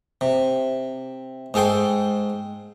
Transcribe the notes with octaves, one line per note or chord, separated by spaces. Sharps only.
C3
G#2 G#4 A4 G5 C6